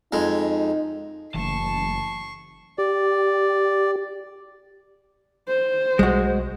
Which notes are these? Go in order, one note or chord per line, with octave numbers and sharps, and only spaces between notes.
F2 G#3 D#4
F#1 E3 A3 A5 C#6 C7
G4 D5
C5
B1 G3 G#3 F#4